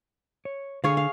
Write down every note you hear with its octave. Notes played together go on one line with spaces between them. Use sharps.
C#5
D3 G#4 C#5 F5
F5